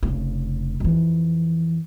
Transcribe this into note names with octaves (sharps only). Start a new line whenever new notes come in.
F1 C#3
F2 E3